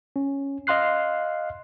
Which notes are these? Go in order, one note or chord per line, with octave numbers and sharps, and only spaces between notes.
C#4
D#5 F5 C6 F#6 C7